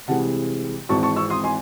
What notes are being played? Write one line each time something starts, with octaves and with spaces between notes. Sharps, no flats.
C2 C3 E3 G#3 F#5 A5
G#1 G#2 E3 C4 A5 C#6
A5 C#6
C#6 E6
C6 D#6
G#5 C6